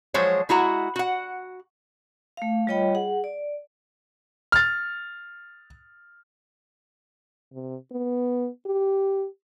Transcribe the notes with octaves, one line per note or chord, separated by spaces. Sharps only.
F3 F#3 G#3 C5 C#5
G#3 E4 F#4 F#5 A#5
F#4 F#5
A3 F5
G3 F4 C#5 D#5 G5 B5
G#4 F#5
D5
F6 A6
C3
B3
G4